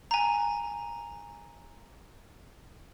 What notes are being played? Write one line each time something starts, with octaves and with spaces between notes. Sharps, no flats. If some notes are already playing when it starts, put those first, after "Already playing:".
G#5 A#5